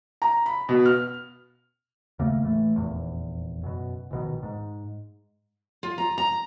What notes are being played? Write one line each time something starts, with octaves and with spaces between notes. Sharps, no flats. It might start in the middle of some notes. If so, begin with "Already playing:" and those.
A#5
B5
B2
F6
D#2 C#3 A3 A#3
A1 E3 A3
F1 A#1 E2
F#2 B2
A#1 B2 D#3
G#2
F4
A#5
A#5